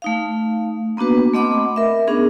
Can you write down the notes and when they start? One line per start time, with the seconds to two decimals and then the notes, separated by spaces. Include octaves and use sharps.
0.02 A3 D#4 F5
0.97 A#3 B3 D4 F#4 B4
1.33 A3 C4 D#5 F#5 B5 D6
1.76 A#4 E5
2.08 B3 C#4 D4 G#4